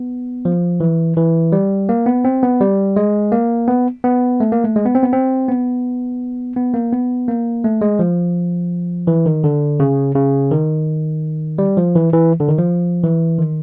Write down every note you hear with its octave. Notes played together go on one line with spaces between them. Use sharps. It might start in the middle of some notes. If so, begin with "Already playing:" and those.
Already playing: B3
F3
E3
E3
G3
A#3
B3
C4
B3
G3
G#3
A#3
B3
B3
A3
A#3
A3
G#3
B3
C4
B3
C4
B3
B3
A#3
B3
A#3
A3
G#3
F3
E3
D#3
D3
C#3
C#3
D#3
G3
F3
E3
E3
D3
D#3
F3
E3
D#3